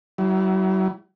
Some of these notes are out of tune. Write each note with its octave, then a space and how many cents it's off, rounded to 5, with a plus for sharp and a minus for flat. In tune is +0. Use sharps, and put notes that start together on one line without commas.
F#3 +45 E4 +0